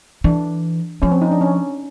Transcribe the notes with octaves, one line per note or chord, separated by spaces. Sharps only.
E3 D4
F3 C#4
C4
D#4
D4
C#4